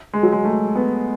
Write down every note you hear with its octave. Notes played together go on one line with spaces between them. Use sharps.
G#3
F#3
G#3
A3
B3